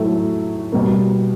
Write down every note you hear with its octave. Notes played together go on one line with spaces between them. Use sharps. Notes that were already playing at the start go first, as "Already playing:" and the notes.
Already playing: A2 F#3 A3
B2 G3 A#3